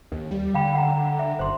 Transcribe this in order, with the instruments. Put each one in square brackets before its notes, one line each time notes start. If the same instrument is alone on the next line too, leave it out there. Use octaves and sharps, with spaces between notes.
[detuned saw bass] D#2
G3
[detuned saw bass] D3 [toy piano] F5 G5 B5
[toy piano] F#5 A#5
E5
[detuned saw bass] F#1 [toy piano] C5 C6